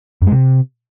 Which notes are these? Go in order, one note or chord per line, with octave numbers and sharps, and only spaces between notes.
F#2
G#3
C3